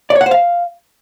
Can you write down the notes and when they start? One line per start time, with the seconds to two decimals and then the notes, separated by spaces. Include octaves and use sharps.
0.10 D5
0.15 C#5
0.21 F#5
0.26 C5
0.31 F5